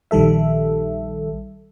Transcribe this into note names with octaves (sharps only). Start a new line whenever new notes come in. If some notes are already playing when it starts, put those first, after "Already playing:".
A#1 D#3 G3 A4 E5